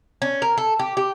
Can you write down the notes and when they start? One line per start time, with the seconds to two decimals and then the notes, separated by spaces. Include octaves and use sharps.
0.22 C#4
0.42 A#4
0.58 A4
0.80 G4
0.97 G4